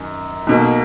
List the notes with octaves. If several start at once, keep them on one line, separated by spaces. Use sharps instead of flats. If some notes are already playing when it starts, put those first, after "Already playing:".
Already playing: F#2 D#3
B1 B2 A#3